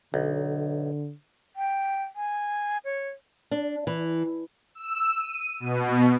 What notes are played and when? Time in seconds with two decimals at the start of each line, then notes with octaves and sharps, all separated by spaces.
0.14 B1 D3
1.56 G5
2.16 G#5
2.85 C#5
3.51 D4
3.87 E3
4.75 E6
5.17 D#7
5.60 B2